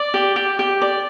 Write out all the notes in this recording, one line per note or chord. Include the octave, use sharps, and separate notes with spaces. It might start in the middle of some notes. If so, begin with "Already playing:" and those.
Already playing: D5
G4
G4
G4
D5